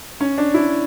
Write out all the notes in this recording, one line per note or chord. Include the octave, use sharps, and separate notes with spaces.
C#4
D4
E4